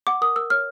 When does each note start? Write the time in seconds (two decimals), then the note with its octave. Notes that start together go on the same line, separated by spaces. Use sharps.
0.07 F#5 D6
0.22 A#4 D#6
0.36 A#4 E6
0.50 C#5 F6